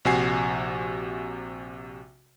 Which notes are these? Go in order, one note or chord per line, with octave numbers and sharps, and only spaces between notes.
A#1 C3 F#4 G#5 C7